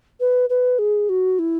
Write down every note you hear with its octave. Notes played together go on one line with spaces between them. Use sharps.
B4
B4
G#4
F#4
E4